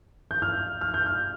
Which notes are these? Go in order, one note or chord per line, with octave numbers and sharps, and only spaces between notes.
G6
F6
F6
G6
F6